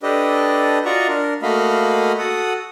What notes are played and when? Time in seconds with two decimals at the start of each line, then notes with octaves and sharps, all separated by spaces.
0.03 D4 G4 A4 B4 D#5
0.85 F4 F#4 D5 D#5 A#5 C#6
1.08 D4 A#4
1.42 A3 A#3 F#4 D#5 F5 B5
2.18 F#4 A4 F#5 D#6